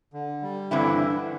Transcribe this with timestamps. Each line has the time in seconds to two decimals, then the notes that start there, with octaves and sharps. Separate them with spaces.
0.13 D3
0.43 G3
0.71 G2 D3 E3 C4 E4
1.14 D3